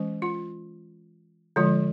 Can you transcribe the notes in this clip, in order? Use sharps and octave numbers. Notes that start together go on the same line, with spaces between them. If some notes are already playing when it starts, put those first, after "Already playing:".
Already playing: E3 G#3 C#4
F4
D3 F3 G#3 F4